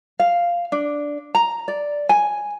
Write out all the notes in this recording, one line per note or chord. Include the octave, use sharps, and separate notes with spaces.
F5
D4
A#5
D5
G#5